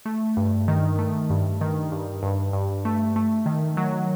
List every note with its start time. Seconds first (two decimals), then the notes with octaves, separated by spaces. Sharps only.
0.06 A3
0.37 G2
0.68 D#3
0.99 A3
1.30 G2
1.61 D#3
1.92 G2
2.23 G2
2.53 G2
2.85 A3
3.16 A3
3.46 D#3
3.77 F#3